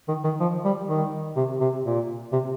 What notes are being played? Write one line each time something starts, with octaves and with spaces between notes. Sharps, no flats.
D#3
D#3
F3
G3
D#3
C3
C3
A#2
C3